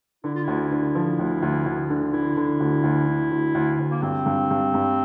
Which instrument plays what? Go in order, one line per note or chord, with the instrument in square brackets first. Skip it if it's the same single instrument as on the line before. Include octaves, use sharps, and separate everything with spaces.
[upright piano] D3 [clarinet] E4
[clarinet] F4
[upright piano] D2 [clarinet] E4
[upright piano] D3
F3
D2
D2
D2
D3
[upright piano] D3 [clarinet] E4
[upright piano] D3
D2
D2
D3
D2
D2
D2
[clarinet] A#3
[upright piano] G2 [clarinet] C4
[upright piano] G2
G2
G2